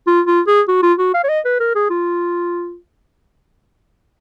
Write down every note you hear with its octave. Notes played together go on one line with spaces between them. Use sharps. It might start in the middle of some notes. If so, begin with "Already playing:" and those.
F4
F4
G#4
F#4
F4
F#4
F5
C#5
D#5
B4
A#4
G#4
F4